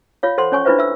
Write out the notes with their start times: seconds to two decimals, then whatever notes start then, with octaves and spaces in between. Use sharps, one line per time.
0.23 F4 C#5 F5
0.38 A4 C5 F#5 C6
0.52 C#4 C#5 G#5 C#6
0.65 D4 E4 F4 B4 C5 E5
0.79 E5 E6